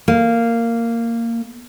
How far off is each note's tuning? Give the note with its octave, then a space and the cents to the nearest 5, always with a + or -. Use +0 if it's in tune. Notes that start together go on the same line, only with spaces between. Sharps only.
A#3 -10